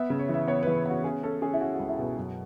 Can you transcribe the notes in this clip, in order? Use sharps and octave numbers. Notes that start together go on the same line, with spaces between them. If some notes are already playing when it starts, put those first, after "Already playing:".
Already playing: B3 E5
C#3
C#5
E3 E5
B3 C#5
E3 B4
B3 F#4
C#4 G#4
C#4 A4
C#4 G#4
E4
C#4 F#4
C#2 F#4
E4
B2
F#2